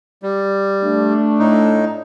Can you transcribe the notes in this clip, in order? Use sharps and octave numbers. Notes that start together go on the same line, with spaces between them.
G3
A3 D4
A2 D#4